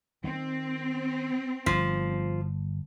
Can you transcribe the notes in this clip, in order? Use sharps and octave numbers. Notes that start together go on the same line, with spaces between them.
D#3 C4
G1 F3